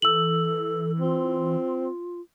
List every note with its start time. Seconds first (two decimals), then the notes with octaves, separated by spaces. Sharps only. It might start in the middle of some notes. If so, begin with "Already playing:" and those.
0.02 E3 A4 E6 F#7
1.00 C4 F4